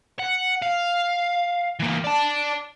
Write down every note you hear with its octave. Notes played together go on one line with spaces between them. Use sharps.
F#5
F5
E3 A#3
D5 A5